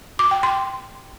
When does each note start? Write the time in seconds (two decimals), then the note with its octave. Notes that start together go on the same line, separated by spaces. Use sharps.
0.19 D6
0.31 G5
0.43 C6